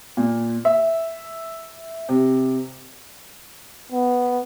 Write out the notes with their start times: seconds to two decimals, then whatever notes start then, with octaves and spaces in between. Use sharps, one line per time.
0.17 A#2
0.65 E5
2.09 C3
3.92 B3